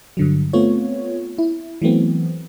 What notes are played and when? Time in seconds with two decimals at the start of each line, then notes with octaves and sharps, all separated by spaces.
0.17 G2 D3 F#3
0.53 A3 B3 C4 F4 C#5
1.38 E4
1.82 E3 F#3 A3 B3 C4